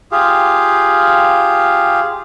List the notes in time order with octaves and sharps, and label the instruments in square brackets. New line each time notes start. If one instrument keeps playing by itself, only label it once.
[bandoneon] F4 G4 G#4 F5